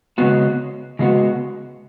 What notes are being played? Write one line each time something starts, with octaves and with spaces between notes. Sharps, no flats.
C#3 G#3 B3 F#4
C#3 G#3 B3 F#4